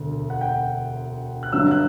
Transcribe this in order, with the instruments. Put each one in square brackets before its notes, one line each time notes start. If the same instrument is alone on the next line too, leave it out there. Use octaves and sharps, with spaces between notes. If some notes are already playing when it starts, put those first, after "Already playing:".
Already playing: [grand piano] E1 D2 D3
F#5
G5
F#6
G1 G2 F#3 E6
F#6